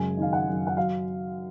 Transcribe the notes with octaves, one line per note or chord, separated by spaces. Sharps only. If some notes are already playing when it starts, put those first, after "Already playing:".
Already playing: F#2 C#3 G#3 G#5
D#3 F5
F#5
F#2
F#5
F#3 F5